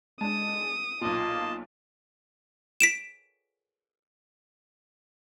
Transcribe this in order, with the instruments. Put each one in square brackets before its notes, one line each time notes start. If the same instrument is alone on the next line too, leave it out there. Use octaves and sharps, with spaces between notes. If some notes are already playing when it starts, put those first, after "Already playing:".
[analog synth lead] G#3 [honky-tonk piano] D4 A5 [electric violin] D#6
[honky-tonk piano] B1 A#2 [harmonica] A#3 D#5 A5 [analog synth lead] F4
[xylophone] B6 D7 E7